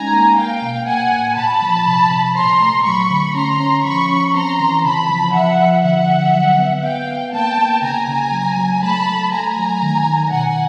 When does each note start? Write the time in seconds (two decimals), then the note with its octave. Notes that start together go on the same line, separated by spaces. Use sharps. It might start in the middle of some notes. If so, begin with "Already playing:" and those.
Already playing: G#3 C#4 D#4 G#5 A#5
0.12 A#3
0.36 A#3 F5 G5
0.62 B2
0.87 A#3 F#5 G#5
1.11 A2
1.36 A#2 A5 B5
1.62 F3
1.86 C3
2.11 C3
2.36 A#2 A#5 C6
2.60 A3
2.85 F#3 B5 C#6
3.10 D3
3.35 C#4 A#5 C6
3.60 C#4
3.84 F3 B5 C#6
4.09 C#4
4.35 C4 A#5 C6
4.59 E3
4.84 C#3 A5 B5
5.09 F3
5.33 F3 E5 F#5
5.59 F3
5.84 D3 E5 F#5
6.09 D3
6.34 F#3
6.59 B3
6.83 B3 F5 G5
7.07 B3
7.33 A#3 G5 A5
7.58 A#3
7.82 C#3 G#5 A#5
8.07 C#3
8.32 F#3
8.57 F#3
8.82 A3 A5 B5
9.07 A3
9.31 A3 G#5 A#5
9.57 F#3
9.82 D#3
10.06 D#3
10.31 B2 F#5 G#5